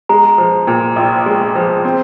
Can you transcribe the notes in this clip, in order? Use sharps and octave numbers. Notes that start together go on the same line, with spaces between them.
G#3 A#5
F3
A#2
A#1
G#3
F3
C4